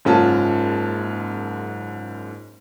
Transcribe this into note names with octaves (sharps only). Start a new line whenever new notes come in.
F#1 G#2 C#4 F4 A5